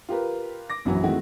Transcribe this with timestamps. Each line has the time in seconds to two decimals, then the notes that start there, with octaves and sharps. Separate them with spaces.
0.09 F4 G4 A#4 B4
0.70 D6 A#6
0.85 A#1 F#2 E3 F#3
1.03 D#3 G#3 A3 C4 E4 F#4